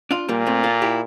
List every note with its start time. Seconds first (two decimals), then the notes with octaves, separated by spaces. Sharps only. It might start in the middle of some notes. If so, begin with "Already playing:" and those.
0.11 D4 F4
0.29 A#2 G3 A#3
0.46 A3 C4
0.63 F4 A4
0.82 E4 G4